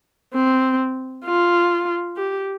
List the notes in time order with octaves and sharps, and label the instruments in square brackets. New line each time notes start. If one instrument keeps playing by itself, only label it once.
[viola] C4
F4
G4